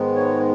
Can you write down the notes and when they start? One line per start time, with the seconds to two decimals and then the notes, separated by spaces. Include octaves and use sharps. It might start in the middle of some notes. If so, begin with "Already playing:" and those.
Already playing: G#2 D#3 G#3 B3
0.16 C#5